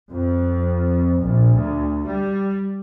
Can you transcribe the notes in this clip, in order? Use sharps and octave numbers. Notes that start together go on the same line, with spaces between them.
F2
A#1
D2
G3